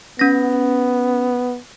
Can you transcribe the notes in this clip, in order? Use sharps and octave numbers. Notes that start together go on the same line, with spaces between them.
B3 C#4 A#6